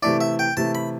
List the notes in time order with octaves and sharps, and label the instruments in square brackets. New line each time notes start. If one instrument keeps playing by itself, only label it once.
[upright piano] C3 E3 A3 E4 [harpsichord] D5
[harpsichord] E5
G5
[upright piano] C3 E3 A3 E4 [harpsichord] A5
[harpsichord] B5